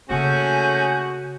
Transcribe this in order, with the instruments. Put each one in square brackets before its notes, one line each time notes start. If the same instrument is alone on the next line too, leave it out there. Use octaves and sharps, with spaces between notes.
[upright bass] C#3 A#3 [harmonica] A3 C#4 G#4 [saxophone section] F#4 [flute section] G#5 G6